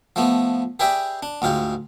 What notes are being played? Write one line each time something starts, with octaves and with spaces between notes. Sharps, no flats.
F3 A3 B3
G4 G#4 B4 D5 E5 G5
D4
D2 G#2 F4 G4